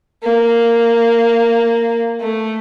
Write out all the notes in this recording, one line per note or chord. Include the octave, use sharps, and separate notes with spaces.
A#3
A3